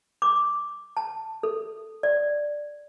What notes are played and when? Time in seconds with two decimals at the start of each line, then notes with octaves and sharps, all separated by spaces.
0.22 D6
0.97 A5
1.43 A4
2.03 D5